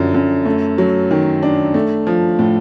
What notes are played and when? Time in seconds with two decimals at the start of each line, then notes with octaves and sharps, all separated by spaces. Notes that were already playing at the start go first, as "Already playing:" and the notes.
Already playing: F#2 D3 F3
0.14 F#2
0.45 A3
0.78 F#3
1.11 D#3
1.43 D4
1.74 A3
2.07 F3
2.39 A2